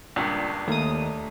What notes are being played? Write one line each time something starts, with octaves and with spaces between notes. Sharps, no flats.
C#2 G2 A#2 D4 G5 C#6
D#2 A3 A#5 D#6